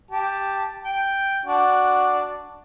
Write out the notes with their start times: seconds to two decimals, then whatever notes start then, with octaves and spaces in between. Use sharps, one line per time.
0.11 G4 A5
0.85 G5
1.46 D4 F#4